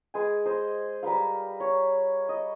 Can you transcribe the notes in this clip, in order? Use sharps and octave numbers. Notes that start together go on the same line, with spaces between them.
G#3 B4 G#5
C5 D#5
G3 A#4 B4 F5
C#5
D#5